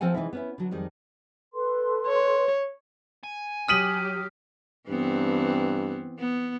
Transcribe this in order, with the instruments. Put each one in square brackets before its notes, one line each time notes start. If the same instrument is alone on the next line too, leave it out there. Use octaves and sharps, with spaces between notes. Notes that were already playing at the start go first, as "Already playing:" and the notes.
[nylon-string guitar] F3 C4 A4 F#5 G#5
C3 E3 F3 G#3 D#4 E4
B3 C#4 E4
D3 F#3
F2 D#3 G3 G#3 D#4
[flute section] A4 B4 C6
[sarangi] C#5
[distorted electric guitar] G#5
[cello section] F#3 G4 [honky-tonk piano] D#6 D#7 F#7 [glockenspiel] F6 B6
[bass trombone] G2 [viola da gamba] E3 B3 C4
[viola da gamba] B3